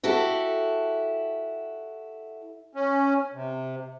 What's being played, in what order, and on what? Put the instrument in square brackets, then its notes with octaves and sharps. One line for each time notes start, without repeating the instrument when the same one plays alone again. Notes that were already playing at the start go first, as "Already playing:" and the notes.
[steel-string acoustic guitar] E4 F#4 G4 A4
[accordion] C#4
C3